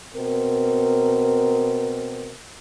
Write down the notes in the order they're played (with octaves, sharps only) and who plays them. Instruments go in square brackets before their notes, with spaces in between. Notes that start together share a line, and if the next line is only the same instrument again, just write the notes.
[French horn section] B2 C4 A#4